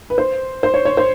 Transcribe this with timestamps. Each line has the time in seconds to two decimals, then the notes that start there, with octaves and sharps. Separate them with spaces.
0.10 B4
0.18 C5
0.63 C5
0.74 C#5
0.85 C#5
0.97 C5